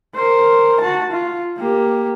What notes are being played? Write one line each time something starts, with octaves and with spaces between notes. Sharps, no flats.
A#4 C5
F#4 A5
F4
A#3 G4